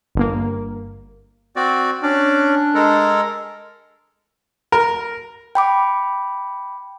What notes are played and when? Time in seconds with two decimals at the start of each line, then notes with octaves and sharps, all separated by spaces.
0.15 G1 A#3
1.56 C4 F#4 D5
2.03 C#4 D4 D5
2.75 G#3 A4 A#4
4.72 A#4
5.55 G5 B5 D6